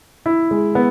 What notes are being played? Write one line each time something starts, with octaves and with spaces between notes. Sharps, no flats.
E4
G#3
B3